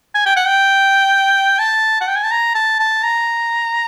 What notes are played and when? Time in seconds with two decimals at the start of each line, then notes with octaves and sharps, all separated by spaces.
0.15 G#5
0.26 G5
0.36 F#5
0.47 G5
1.59 A5
2.01 F#5
2.08 G5
2.16 G#5
2.24 A5
2.31 A#5
2.55 A5
2.79 A5
3.04 A#5